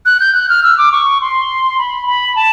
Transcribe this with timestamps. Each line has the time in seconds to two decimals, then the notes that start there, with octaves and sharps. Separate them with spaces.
0.06 F#6
0.20 G6
0.35 F#6
0.49 F6
0.63 E6
0.78 D6
0.92 C#6
1.21 C6
1.78 B5
2.07 B5
2.36 A5